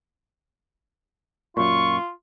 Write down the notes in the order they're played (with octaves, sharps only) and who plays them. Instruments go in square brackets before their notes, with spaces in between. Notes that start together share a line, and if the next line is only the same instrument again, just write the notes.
[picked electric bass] F#2 A#2 [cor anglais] F4 [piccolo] C#6